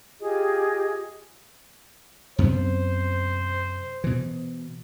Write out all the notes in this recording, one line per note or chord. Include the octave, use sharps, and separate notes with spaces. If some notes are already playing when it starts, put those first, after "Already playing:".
F4 G4 G#4 D#5
F#2 C3 B3 C5
B2 E3